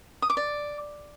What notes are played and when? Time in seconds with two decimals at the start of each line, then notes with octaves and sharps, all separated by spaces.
0.22 D#6
0.30 D6
0.37 D5